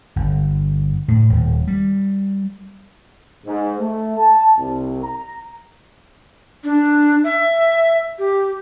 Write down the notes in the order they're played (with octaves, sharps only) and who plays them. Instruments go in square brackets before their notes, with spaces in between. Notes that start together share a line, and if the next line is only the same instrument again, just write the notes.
[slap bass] G1
A2
D#1
G3
[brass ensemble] G#2
A3
A5
C2
A#5
[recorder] D4
E5
G4